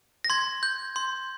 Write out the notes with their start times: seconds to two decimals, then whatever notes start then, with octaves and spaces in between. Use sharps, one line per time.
0.24 A#6
0.30 C6 G#6
0.63 G6
0.96 C6